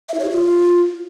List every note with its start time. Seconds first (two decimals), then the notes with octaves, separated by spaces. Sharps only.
0.09 E5
0.14 E4
0.19 C#5
0.24 G4
0.30 F4